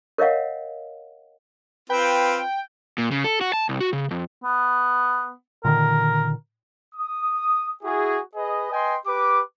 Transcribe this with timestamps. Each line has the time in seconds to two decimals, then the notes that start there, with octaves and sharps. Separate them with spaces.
0.18 A#4 C#5 D#5 F5 F#5
1.90 C4 F4 B4 G5
2.98 A#2
3.11 C#3
3.24 A4
3.41 F#4
3.53 A5
3.69 C2
3.81 F#4
3.93 C#3
4.11 F2
4.44 B3
5.65 A#2 D3 D#3 A#4
6.95 D#6
7.83 E4 F#4 G#4
8.35 G#4 B4 D#5
8.71 B4 D#5 G5 G#5 C6
9.06 G4 B4 D6